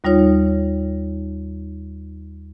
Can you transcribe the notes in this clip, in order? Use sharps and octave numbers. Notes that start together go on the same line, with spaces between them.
D#2 G3 D#4 F4 C#5